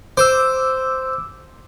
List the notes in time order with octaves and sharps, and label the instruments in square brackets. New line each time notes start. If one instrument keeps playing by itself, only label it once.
[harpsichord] C5 [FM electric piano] D6 E6